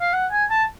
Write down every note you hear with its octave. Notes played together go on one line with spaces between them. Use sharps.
F5
F#5
G#5
A5